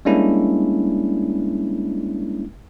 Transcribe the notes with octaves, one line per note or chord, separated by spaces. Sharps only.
G3 G#3 A#3 C#4 D4 E4